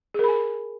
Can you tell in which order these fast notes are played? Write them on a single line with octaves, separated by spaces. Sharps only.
G#4 A#4 B5 G#5